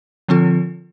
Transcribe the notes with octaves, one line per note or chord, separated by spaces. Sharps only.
D3 F3 C4 F4 A4